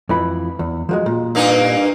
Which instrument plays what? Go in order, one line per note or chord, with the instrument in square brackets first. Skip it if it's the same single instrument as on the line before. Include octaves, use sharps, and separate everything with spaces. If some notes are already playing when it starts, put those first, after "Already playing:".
[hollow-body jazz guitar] F2 E3 B5
E2
F3 F#3 G#3
A#2
[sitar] G2 A#3 D#4